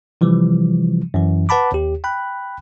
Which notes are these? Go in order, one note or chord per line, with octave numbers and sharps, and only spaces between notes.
C3 E3 F3 G3
F#2 E3
B4 F#5 A5 B5 D6
D#2 G4
G5 B5 F#6